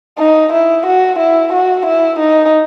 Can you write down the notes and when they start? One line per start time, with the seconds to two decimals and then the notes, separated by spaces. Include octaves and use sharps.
0.19 D#4
0.52 E4
0.86 F#4
1.19 E4
1.53 F#4
1.86 E4
2.20 D#4